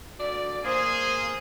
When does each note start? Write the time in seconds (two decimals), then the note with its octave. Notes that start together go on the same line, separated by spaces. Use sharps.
0.18 D2 D5
0.64 A#3 G#4 C5